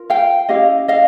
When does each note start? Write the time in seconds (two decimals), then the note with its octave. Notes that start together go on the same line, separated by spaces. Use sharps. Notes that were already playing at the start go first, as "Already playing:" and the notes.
Already playing: F4 A#4
0.10 F5 G5
0.49 C#4 E4 G4 D#5 F5
0.88 D#5 F5